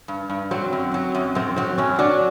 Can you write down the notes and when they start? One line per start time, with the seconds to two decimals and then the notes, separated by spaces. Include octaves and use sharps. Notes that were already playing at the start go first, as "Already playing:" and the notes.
0.08 G2
0.30 G2
0.51 F#3 C4
0.73 F#2
0.94 F#3
1.15 F#2
1.35 F#2 C4
1.56 F#3 C4
1.78 F#2 C#4
1.99 F#3 D4